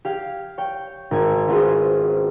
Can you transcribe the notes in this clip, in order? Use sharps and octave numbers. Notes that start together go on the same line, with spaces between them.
G4 F5 G#6
C#5 G5
G#1 G#5 G#6
C#4 F4 F#4 G#4 B4 C5